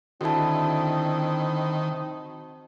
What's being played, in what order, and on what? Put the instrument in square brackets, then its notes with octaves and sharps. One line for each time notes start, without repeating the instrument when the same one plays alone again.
[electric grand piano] D3 E4 [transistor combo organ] D#3 [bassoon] C4 [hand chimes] F#4 A5